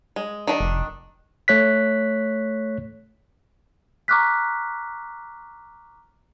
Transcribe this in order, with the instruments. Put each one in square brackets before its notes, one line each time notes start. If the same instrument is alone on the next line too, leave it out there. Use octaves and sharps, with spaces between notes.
[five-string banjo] G#3
D#3 D4
[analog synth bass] F1
[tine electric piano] A3 C#5 F#6 B6
[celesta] A#5 C#6 D6 F6 F#6 B6